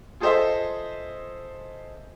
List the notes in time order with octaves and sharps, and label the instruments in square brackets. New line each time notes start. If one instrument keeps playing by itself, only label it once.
[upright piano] F4 G#4 A4 C5 D#5 E5